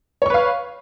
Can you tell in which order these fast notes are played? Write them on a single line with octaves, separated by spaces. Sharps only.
C#5 C#6 B4 F5